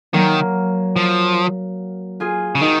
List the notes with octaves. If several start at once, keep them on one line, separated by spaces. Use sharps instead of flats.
D#3 F#3 A#3
F3
F4 G#4
C#3
D#3 D#4 F#4